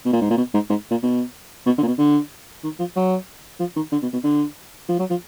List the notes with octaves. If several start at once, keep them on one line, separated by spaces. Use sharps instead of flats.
B2
A#2
G#2
A#2
B2
G#2
G#2
A#2
B2
B2
D3
A#2
B2
D3
D#3
F3
F#3
F3
D#3
D3
B2
B2
D3
F3
F#3
F3